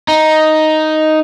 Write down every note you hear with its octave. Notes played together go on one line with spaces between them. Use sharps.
D#4